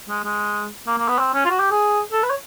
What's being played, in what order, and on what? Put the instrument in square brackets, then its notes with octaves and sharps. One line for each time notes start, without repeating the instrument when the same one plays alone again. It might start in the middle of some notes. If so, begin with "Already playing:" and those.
[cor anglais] G#3
G#3
A#3
A#3
B3
C4
C#4
F4
F#4
G4
G#4
A4
B4
C#5